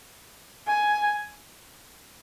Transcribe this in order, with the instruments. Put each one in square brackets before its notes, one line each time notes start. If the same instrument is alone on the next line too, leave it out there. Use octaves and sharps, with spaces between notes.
[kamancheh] G#5